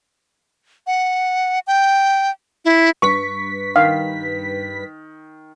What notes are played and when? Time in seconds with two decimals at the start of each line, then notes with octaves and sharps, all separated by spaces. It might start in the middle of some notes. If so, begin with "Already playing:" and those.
0.87 F#5
1.67 G5
2.65 E4
3.02 G2 B4 C#6 B6
3.76 D#3 F5